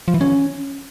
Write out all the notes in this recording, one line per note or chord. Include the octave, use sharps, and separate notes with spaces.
F3
E3
C#4